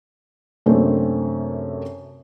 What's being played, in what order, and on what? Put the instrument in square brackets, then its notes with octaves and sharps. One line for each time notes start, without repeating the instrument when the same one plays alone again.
[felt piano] F#2 C3 A3 A#3 C4 D4